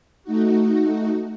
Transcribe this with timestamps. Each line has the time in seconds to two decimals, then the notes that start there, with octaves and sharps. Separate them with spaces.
0.24 A3 D#4 F#4